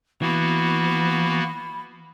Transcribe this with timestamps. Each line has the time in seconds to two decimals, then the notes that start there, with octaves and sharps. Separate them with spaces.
0.22 E3 A#3 B3 F#4 B5